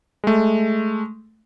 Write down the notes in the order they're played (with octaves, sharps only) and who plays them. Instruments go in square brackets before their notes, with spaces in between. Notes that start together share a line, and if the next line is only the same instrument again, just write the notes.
[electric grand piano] G#3 A3